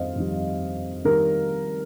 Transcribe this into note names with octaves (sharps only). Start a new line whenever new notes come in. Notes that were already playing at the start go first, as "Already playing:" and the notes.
Already playing: F2 D#3 G3 C5 D#5 F5
F2 D#3 G3
D#3 G3 A#4